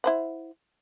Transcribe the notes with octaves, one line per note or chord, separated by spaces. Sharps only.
E4 C5 F#5